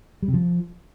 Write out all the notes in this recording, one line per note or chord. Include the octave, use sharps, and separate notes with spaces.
G3
C3
F3